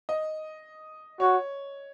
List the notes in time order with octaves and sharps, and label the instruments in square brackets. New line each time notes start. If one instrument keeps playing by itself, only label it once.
[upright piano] D#5
[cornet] F#4 [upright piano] C#5